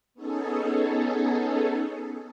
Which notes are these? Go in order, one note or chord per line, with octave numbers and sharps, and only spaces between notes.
B3 C#4 D#4 G#4 A4